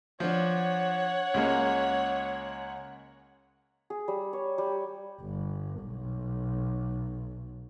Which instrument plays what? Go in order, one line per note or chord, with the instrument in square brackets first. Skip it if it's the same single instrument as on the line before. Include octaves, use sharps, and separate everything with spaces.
[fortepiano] F3 D4 [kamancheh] C#5 F#5
[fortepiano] C#2 G#3 A#3
[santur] G#4
G3
C#5
G3
[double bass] G1
B1